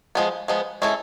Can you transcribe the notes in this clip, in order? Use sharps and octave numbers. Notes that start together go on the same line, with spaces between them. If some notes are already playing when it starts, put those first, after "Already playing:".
F3 G#3 B3
F3 G#3 B3
G#3 C#4 E4 A4